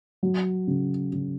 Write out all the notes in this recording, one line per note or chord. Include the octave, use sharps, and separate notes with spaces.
F#3
C#3
C#3